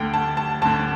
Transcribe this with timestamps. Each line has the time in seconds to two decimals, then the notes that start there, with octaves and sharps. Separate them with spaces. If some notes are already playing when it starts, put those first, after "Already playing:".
Already playing: D2 D3 G5
0.14 A5
0.37 A5
0.62 D2 D3 A5